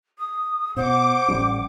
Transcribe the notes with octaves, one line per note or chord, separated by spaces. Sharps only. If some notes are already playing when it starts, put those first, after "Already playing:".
D#6
B2 C5 F#5 D6
A1 G3 C#4